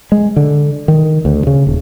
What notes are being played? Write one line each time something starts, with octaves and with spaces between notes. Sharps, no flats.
G#3
D3
D#3
D2
C#3
D#1